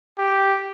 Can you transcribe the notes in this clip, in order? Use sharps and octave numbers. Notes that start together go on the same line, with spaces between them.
G4